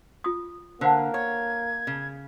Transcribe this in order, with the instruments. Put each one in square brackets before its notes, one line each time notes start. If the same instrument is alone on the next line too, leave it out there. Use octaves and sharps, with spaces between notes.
[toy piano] F4 D#6
[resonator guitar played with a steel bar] D3 [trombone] A#3 [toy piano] A#4 C5 F#5
[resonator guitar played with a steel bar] C#5 [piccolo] G#6
[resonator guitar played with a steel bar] C#3